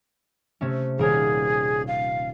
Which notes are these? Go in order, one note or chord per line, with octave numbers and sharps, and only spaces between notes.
C3 A3 C#4
D#1 G#4 A#4 C#5
F5